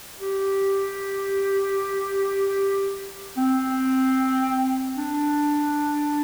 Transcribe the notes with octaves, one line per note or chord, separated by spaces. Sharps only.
G4
C4
D4